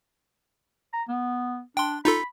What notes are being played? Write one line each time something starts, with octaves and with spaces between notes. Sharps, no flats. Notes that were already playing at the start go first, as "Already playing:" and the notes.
A#5
B3
D4 G5 C6
D#4 F4 A4 B5